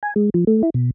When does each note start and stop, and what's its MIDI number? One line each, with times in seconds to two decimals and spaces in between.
0.03 0.14 80
0.16 0.30 56
0.34 0.45 53
0.47 0.62 57
0.63 0.70 64
0.74 0.90 47